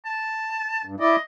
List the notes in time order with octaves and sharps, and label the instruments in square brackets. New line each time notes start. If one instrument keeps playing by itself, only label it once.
[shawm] A5
[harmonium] G2
[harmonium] E4 D5 [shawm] D#5